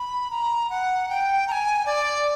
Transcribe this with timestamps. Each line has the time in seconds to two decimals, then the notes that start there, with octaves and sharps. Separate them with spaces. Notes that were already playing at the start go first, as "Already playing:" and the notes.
Already playing: B5
0.31 A#5
0.70 F#5
1.09 G5
1.48 A#5
1.52 G#5
1.86 D5